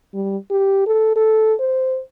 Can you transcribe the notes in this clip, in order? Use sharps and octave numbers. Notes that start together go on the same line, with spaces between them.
G3
G4
A4
A4
C5